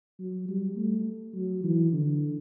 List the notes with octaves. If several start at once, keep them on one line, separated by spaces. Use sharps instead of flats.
F#3
G3
A3
F#3
E3
D3